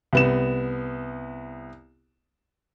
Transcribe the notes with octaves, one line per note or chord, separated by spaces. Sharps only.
C2 B3 E7